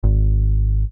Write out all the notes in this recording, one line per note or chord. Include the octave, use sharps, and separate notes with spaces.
G#1